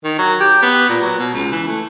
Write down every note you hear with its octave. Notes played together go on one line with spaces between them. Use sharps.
D#3
F#3
G4
B3
A#2
F#3
B2
C#2
E3
A3